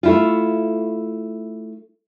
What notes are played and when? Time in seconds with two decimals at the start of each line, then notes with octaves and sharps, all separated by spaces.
0.03 A3 E4 F4